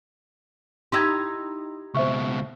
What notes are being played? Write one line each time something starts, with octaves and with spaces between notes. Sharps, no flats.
D#4 E4 G4 C6 E6 G#6
C#2 B2 C5 E5 C#6